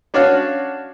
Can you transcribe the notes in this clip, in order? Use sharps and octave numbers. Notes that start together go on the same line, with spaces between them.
C#4 D4 F#4 C#5 F5 F#5